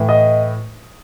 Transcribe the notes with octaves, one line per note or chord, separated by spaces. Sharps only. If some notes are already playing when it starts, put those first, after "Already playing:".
Already playing: A2 E3
D#5